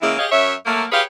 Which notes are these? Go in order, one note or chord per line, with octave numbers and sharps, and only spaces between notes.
C#3 E3 G#3 A#3 E4
G4 G#4 C#5 D#5 F5
F#2 C#5 E5
F#3 A3 A#3
G4 G#4 B4 C#5 F5